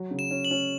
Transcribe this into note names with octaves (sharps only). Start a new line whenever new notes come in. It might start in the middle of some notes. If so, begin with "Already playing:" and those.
Already playing: F#3
C#3
E7
C#4
F#7
C#4